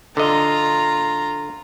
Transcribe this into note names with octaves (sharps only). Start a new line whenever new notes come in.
D3 F4 D#5 A#5